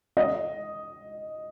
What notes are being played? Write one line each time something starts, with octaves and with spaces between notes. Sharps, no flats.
D#5